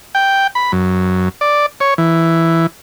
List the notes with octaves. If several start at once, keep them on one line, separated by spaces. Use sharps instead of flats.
G5
B5
F#2
D5
C#5
E3